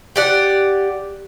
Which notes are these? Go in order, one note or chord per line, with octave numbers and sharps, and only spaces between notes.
G4 D5 F#5